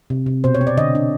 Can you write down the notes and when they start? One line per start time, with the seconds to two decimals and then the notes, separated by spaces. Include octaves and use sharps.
0.10 C3
0.26 C3
0.44 B2 C5
0.55 C#5
0.61 C4
0.67 D5
0.77 D3 D#5
0.95 D4